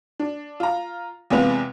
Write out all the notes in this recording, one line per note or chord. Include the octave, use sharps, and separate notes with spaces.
D4
F4 A#5
E2 C3 G#3 F4 B4 F7